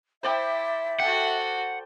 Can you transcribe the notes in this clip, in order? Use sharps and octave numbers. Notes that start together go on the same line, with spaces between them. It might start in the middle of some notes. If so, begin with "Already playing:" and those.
E4 C5 D5 E5 G5
F#4 A4 F#5 G5